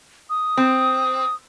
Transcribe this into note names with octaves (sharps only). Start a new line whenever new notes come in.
D#6
C4